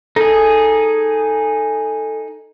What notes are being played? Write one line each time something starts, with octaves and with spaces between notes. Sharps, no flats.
D#4 G#4 A4